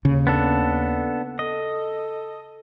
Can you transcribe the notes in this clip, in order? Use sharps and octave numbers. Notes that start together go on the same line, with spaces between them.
D#2 C#3
B3 D4 A4
A4 D#5